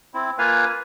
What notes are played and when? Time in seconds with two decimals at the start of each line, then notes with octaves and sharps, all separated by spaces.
0.14 C4 E4
0.38 A#3 F4 B4 F5 G#5